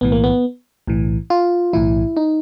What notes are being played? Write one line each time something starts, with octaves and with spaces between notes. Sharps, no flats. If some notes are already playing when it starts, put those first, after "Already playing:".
B1 A2 E3 B3
A#3
B3
B1 A2 E3
F4
B1 A2 E3 E4
D#4